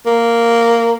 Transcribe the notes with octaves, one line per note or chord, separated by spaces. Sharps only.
A#3